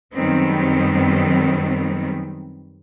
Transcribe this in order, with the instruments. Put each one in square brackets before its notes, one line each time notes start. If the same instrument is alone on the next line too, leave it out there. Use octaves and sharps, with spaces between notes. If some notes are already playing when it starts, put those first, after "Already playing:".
[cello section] F#2 D#3 G3 G#3 B3 C4